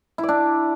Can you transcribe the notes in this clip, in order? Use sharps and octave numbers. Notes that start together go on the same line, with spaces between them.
E4
D5
D4